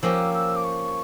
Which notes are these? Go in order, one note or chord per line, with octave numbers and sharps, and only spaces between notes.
F3 A#3 C#4 G4 E6
E6
D6
C#6